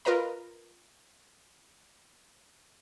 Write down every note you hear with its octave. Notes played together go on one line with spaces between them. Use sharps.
F4 A#4 B4 D#5 A#5